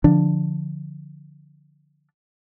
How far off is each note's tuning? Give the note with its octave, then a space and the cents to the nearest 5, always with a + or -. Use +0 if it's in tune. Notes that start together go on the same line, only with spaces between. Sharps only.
D3 +0 F3 -5 D4 +5